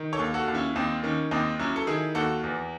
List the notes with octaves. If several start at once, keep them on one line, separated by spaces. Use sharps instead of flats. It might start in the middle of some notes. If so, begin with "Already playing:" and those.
Already playing: D#3
A4 C#5
D#2
F#4 A4
D#2
C#4 E4
D#2 C4 D#4
D#3 C#4
D#2 C4 D#4
F#3 C#4 E4
A4
D#3 E4 G#4
D#2 F#4 A4
E2